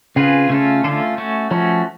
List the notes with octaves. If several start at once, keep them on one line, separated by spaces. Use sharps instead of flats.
C#3 C4 F4 G#4 B4
C#3 A3 C#4 F4 A4
D3 A3 C#4 F4 A4
A3 C#4 F#4
F3 A3 C#4 F#4